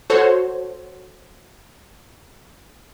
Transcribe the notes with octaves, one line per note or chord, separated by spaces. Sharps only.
F#4 A4 C5 C#5